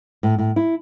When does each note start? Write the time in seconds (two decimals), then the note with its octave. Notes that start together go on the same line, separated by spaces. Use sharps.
0.23 A2
0.38 A2
0.56 E4